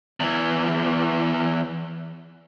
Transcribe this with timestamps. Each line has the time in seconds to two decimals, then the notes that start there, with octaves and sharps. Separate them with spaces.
0.20 E2 E3